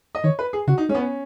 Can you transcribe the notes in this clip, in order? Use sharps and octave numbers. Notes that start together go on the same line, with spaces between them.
D#5
D#3 C#5
B4
G#4
C#3 F#4
D#4
G#3 C#4
B3
C#4